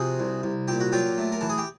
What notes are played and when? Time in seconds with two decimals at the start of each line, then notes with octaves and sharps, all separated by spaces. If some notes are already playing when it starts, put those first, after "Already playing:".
Already playing: C3 F3 F#4 G#4
0.20 C2
0.43 C2
0.68 A#2 G4
0.80 F#4
0.92 F#3 F4 G4
1.18 A3
1.32 A#4
1.41 E3 A4
1.49 G#4
1.58 G4